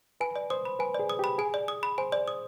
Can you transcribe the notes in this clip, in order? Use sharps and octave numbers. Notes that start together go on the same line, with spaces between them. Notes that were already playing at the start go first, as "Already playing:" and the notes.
B4 G#5
D5
C5 D#6
B5
B4 G#5
G#4 D5
D#6
G4
B5
G#4 G#5
D5
D#6
B5
C5 G#5
D5
D#6